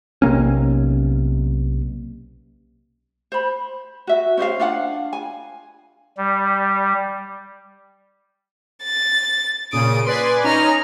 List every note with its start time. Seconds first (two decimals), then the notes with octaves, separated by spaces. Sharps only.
0.22 B1 C3 A#3 C#4
3.32 C5 B5
4.07 F#4 E5
4.37 C#4 C5 D#5 F5
4.59 D4 F4 F5 F#5
5.13 G#5
6.18 G3
8.83 A6
9.73 A#2 C#3 D#6 D7
10.07 B4 D5 G#5 C6
10.44 C#4 D#4 A#5 F6